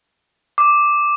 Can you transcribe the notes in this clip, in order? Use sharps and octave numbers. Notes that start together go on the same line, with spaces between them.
D6